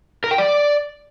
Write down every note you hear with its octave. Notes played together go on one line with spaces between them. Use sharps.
A#4
G5
D5